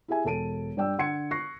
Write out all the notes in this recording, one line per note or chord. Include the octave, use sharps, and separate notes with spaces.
E4 G4 G#4 E5 G#5
E1 A4 A5 D7 D#7
G2 D5 G5 E6
D3 F#5 C6 G#6 C#7
C#6 F#6 A#6 C7